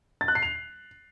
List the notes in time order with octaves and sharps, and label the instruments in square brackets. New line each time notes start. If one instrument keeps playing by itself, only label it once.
[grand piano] A6
F#6
C7
F7